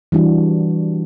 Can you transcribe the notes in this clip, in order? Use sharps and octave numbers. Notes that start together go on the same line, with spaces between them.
E3 G3 D4 F#4